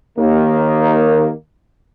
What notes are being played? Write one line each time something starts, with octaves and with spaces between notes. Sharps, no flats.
D#2 D#3 A#3